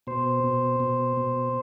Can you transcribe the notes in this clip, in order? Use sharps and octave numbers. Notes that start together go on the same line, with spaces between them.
B2 C5
B2
B2
B2